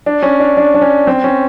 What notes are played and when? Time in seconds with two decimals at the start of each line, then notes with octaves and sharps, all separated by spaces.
0.06 D4
0.22 C#4
0.40 D4
0.57 D4
0.74 D4
0.81 C#4
1.07 C4
1.24 C#4